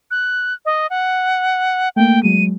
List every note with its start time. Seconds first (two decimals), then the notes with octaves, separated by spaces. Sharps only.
0.11 F#6
0.66 D#5
0.90 F#5
1.96 A3 A#3 G5
2.23 F#3 G#3 D#7